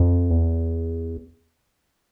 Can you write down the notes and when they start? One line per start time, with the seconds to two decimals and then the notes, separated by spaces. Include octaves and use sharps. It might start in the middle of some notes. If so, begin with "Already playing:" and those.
Already playing: F2
0.30 E2